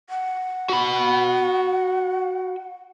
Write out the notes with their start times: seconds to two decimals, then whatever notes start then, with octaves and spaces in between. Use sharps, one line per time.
0.10 F#5
0.69 F#4 B5